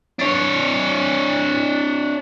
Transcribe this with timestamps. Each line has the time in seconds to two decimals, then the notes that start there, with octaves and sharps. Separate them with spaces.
0.19 D4 C#5